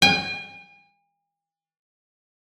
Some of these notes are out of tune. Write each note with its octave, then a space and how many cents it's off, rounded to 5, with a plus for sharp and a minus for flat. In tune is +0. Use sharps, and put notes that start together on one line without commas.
G#5 -45